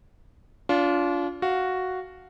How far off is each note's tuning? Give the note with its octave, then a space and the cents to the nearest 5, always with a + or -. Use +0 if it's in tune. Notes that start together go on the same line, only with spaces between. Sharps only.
D4 -35 F4 +0
F#4 +0 F5 +0